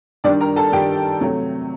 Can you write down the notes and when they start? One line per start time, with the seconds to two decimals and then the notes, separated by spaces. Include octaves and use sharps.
0.24 G2 D#3 G3 D4 D5
0.40 A#4 A#5
0.56 A4 A5
0.72 G2 D#3 G3 G4 G5
1.20 C3 F#3 A3